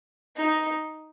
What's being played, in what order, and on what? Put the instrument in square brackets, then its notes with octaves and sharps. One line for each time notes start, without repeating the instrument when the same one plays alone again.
[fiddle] D#4